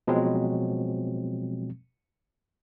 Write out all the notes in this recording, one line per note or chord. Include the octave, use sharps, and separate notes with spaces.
B2 F3 F#3 G#3 C4